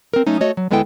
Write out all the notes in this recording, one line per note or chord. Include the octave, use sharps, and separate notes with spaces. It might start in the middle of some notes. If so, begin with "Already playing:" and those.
C4 A#4
F#3 A3 C#4 D#4
A3 F#4 C#5 D#5
F#3
D2 G#3 B3 E4 A4 G5